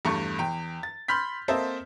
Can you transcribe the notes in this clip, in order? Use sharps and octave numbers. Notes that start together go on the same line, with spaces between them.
E2 G2 A3 C#6
E2 G5
A6
B5 C6 F6 G6 B6
A#3 C4 A4 C5 D#5 E5